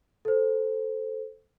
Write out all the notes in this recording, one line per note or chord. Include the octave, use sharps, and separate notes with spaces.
A4 C5